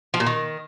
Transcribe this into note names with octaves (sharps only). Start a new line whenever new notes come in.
F3
A#2
D#3